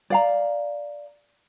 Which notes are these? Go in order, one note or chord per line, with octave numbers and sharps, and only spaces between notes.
D5 F5 A#5